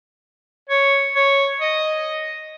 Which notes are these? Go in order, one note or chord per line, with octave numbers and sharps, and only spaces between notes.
C#5
C#5
D#5